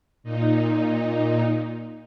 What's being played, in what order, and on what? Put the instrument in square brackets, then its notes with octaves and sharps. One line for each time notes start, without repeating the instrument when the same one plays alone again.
[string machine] A#2 D#4